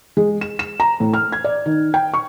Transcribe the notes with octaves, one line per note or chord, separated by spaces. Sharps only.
G#3
E7
E7
A#5
A2
F6
G#6
D5
D#3
G5
C#6